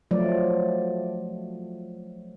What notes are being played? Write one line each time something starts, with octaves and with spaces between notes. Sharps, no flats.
F3 F#3 A3 D5